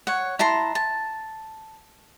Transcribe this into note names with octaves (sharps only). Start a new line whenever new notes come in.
C#5 F#5
E4 A5 A#5 C6
A5